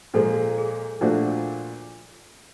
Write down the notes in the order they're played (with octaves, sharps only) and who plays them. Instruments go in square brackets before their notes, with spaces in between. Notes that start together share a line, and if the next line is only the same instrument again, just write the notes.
[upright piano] A#2 F3 G#3 [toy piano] A4
[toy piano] G#4
[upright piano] A#2 F3 A3 D4 F#4